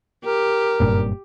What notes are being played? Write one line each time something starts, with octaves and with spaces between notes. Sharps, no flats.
G4 A#4
F#1 G2 A#2